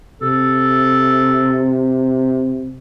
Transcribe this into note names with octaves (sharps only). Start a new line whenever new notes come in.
C3 A4